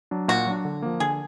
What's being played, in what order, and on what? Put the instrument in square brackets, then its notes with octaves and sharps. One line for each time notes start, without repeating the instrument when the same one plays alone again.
[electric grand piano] F#3 D4
[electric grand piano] A#2 [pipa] F#4
[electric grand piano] F#3 D4
D3
F3 A#3
[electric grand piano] D3 [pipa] G#4